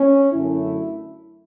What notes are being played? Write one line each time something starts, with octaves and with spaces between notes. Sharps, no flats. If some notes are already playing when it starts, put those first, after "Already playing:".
Already playing: C#4
F#2 D3 F#3 A3 E4